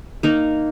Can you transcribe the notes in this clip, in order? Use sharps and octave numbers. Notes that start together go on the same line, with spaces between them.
A#3 D#4 A#4